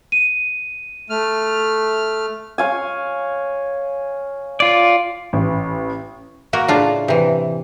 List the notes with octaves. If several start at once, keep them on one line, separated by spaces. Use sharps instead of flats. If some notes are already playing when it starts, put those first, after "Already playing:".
D#7
A3 F6
C#5 F5 G#5
F4 D5
A1
A#3 F#4 A#4
A2 C#3 D4 F4
C3 E3